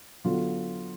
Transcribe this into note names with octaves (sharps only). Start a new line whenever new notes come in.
D3 F#3 B3 F4